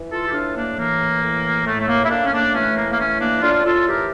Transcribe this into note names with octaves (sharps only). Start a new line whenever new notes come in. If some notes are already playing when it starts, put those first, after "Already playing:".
Already playing: E3
F4 A4
G4
A2 D4 F4
A#3 D4
E3 A#3
A2
A2 A3
A3
A#3
E4
A2 A#3 D4
C#4
A#3 D4
E3 A3 C#4
A#3
A#3
A2 A3 C#4
A#3 D4
A2 D4 F4
F4 A4
E3 G4 A#4